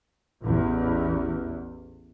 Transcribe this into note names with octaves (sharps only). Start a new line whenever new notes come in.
A1 E2